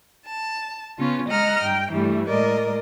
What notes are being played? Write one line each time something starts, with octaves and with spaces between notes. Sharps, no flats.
A5
C#3 B3 C#4 F4
G#3 D#5 F#5 A#5 F6
G2 G5
G2 E3 G3 A3
A2 G#3 A#4 D5 D#5